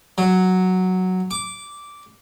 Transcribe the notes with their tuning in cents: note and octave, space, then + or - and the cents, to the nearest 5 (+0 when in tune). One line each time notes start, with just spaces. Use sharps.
F#3 +0
D6 -10